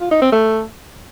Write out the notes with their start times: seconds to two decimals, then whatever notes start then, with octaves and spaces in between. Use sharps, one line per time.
0.01 F4
0.11 D#4
0.22 C4
0.33 A3